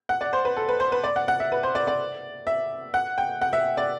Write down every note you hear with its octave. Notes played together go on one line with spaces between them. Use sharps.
F#5
D5
C5
B4
A4
B4
C5
B4
D5
F#5
F#5
E5
B4
C5
D5
D5
E5
F#5
G5
F#5
E5
D5